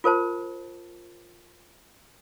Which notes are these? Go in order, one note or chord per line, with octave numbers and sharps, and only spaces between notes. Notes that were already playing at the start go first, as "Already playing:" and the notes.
F4 A#4 C5 A5